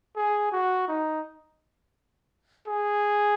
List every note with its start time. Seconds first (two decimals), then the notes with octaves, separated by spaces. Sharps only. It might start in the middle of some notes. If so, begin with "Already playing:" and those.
0.16 G#4
0.52 F#4
0.88 D#4
2.67 G#4